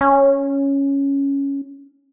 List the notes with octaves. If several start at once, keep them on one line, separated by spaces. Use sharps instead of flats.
C#4